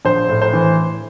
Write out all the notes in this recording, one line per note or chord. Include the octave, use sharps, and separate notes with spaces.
A#1 C5
A2
C5
E3